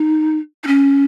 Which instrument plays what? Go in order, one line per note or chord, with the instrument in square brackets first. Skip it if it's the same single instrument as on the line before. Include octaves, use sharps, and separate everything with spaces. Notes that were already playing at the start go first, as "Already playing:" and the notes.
Already playing: [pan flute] D#4
D#4
C#4